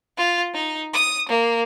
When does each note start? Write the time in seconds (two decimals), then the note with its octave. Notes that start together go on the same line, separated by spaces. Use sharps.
0.16 F4
0.53 D#4
0.92 D#6
1.27 A#3